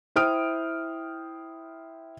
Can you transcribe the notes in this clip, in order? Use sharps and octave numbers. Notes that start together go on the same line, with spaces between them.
E4 C5 G5 D#6 F6 D7